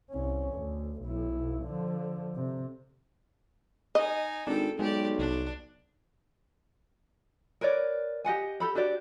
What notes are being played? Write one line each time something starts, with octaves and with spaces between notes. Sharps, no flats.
C2 C#4
D2
B1 E4
D3 F3
C3
D#4 D#5 G#5
G#1 D4 A4 G5
B1 G#3 G4 D5
C2 D4
A#4 B4 C#5 D5
G4 D#5 F#5 G#5
G4 A4 B5
D4 F#4 G4 D5